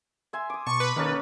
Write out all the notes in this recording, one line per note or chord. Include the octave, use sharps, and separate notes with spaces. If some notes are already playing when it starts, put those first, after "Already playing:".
E5 G#5 C6
D6 D#6
B2 A5 C#6
B4
D#3 A#3 C#4 A4 D#5